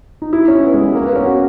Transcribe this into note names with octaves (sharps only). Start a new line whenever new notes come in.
D#4
E4
C#4
B3
G#3
G#3
A#3
B3
C#4
F#4